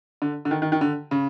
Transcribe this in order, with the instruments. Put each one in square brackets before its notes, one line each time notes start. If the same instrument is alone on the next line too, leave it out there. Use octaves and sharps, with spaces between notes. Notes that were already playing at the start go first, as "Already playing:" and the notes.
[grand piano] D3
D3
D#3
D#3
D#3
D3
C#3